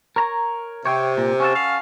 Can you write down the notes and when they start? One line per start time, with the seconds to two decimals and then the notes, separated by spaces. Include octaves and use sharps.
0.16 A#4 C#5 A#5
0.85 C3 C#5 G5
1.17 A#2
1.40 C#4 F#4 A4
1.55 F5